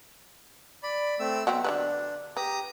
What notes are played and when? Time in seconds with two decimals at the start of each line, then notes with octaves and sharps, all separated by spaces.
0.83 D5 B5
1.20 A3 C4 E6
1.47 F#3 B3 C4 E5
1.64 D3 G3 D4 B4
2.37 G4 B4 A#5 D#6